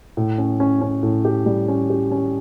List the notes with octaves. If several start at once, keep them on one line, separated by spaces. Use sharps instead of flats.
A2
C#4
C#4
C#4
A2
G4
G3
C#4
G4
C#4